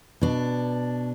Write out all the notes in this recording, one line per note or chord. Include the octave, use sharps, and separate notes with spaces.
B2 D4